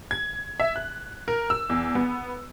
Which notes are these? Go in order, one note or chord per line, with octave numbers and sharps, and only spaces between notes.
G#6
E5
F#6
A#4
E6
E2
B3